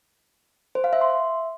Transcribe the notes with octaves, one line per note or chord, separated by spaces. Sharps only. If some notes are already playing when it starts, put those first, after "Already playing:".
C5
F5
E5
C6
E5